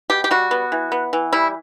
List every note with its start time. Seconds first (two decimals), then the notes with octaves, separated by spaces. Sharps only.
0.10 B2 G4
0.24 G4
0.31 G3 F#4
0.51 B3
0.72 E3
0.92 B3
1.13 E3
1.33 G3 E4